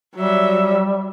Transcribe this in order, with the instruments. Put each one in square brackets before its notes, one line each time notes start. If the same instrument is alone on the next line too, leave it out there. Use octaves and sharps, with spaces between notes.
[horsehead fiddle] F#3 E5 [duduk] G3